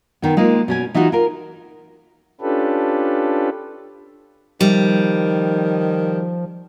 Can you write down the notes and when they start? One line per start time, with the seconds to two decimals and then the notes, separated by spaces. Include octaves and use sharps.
0.22 D#3 B3
0.37 G#3 A#3 D#4 F4
0.68 B2 C#4 G#5
0.94 E3 D#4 F4 F#4
1.12 F4 A#4 F5
2.41 C#4 D4 F4 G4 A4 B4
4.61 D#3 F3 G3